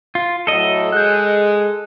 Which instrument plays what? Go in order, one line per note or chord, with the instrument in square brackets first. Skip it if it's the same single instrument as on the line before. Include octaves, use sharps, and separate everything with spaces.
[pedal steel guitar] F4
[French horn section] A2 F#3 [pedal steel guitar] A4 D#5
[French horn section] G#3 [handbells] F#6 G6